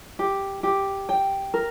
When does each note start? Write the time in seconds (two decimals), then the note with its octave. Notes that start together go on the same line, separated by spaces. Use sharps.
0.19 G4
0.63 G4
1.09 G5
1.54 A#4